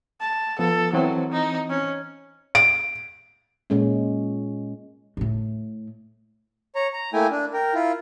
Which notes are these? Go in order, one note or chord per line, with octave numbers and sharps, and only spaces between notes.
A5
F3 B3 A4
E3 F#3 C4 C5
D#4
C#4
D7
A#2 G#3 C#4
A2 A3
C#5 A#5
A#5
A3 A#3 E4 G5 G#5
D4
A#4 G5
E4 F4